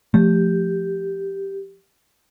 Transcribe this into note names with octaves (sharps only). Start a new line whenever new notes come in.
F3 A3 G4